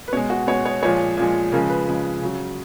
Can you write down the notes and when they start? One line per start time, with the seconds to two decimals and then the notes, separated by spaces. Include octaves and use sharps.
0.08 B4
0.13 B2 C#5
0.17 G#3
0.30 F#4
0.47 B2 G#3 C#5
0.65 C#5
0.83 A#2 F3 G#3 C#5
1.17 A#2 F3 G#3
1.52 C#3 F3 G#3 A#4
1.70 B4
1.87 C#3 F3 G#3
2.22 C#3 F#3